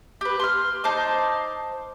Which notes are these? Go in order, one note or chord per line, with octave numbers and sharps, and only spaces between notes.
G4 B4
C6 F6
D#4 C5 A5 D6